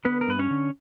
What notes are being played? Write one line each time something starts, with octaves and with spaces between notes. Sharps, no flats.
D3 B3 B4
A#4
G2 B4
C#4 C#5
D3